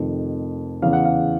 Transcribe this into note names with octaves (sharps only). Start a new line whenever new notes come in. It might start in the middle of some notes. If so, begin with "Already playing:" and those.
Already playing: F1 F2 C3 D#3
E2 C#3 E3 F5
F#5
F5